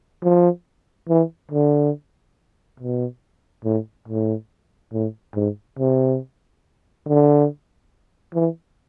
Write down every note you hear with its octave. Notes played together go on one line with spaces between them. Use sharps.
F3
E3
D3
B2
A2
A2
A2
G#2
C3
D3
E3